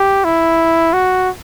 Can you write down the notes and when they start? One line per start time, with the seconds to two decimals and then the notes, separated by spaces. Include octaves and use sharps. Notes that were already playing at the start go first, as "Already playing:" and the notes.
Already playing: G4
0.25 E4
0.93 F#4